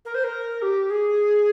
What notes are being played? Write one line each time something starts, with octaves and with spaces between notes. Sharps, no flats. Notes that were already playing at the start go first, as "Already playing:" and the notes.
A#4
C5
A#4
G4
G#4